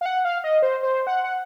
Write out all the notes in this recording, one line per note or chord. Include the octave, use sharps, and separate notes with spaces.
F5
F#5
F5
D#5
C5
C5
F#5
F#5